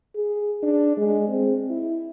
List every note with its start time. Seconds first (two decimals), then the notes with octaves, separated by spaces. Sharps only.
0.15 G#4
0.63 D4
0.97 G#3
1.28 C4
1.70 E4